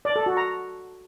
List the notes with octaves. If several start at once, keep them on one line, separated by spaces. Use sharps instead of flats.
D5
A4
F#4
A#5